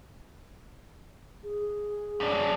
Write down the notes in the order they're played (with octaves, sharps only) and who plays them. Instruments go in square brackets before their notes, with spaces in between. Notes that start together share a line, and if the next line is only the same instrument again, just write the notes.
[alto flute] G#4
[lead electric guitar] F#2 D4